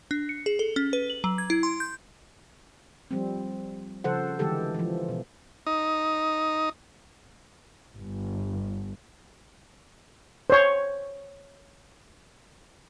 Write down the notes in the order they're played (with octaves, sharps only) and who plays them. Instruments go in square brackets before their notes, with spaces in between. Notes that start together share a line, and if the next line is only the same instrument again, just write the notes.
[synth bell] D4
C#7
G#4
A4
C#4
B4
F#7
F#3
G#6
E4
C6
G6
[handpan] F3 G3 C4
C#3 F3 A4 C5 F#5
D3 E3 G#3 G4 A4
E3 F3
B2
[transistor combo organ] D#4
[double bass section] G1
[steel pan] C5 C#5